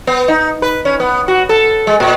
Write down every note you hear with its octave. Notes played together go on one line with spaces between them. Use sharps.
B3
D#4
B4
C#4
B3
F#4
A4
G#3
A#2